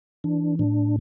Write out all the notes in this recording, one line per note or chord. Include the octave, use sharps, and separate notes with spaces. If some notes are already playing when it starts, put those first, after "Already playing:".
E3 D4
A2 D4